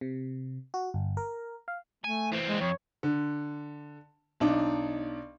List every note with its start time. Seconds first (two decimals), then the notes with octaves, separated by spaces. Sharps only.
0.01 C3
0.74 F#4
0.94 G1
1.17 A#4
1.68 F5
2.04 A3 G#5
2.32 E3 C4
2.48 G#3
2.61 F2 C#5
3.03 D3
4.40 B1 D4 D#4